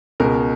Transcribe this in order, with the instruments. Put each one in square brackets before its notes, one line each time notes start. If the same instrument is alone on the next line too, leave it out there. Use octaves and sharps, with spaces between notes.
[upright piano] C#2 B2 G#3 A#4